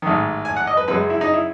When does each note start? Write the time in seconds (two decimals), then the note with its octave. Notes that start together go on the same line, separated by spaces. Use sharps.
0.02 A1 G#2 D#3
0.45 G#5
0.56 F#5
0.67 D#5
0.77 B4
0.88 F#2 C#3 G#3 B4
1.10 E4
1.21 D#4
1.34 E4